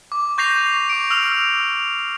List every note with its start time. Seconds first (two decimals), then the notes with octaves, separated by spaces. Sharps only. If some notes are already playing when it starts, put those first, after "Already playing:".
0.12 D6
0.38 C#6 G6 A#6 C7 F7
0.89 D6 D7
1.11 E6 F6 F7